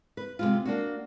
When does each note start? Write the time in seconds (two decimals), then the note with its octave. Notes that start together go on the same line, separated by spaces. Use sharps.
0.17 B4
0.39 C3 G#3 F4
0.66 A#3 D4 F#4